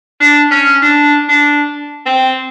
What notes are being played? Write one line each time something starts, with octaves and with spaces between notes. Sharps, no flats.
D4
C#4
D4
D4
C4